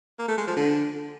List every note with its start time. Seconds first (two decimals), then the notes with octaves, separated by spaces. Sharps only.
0.19 A#3
0.28 A3
0.38 G#3
0.47 F3
0.57 D3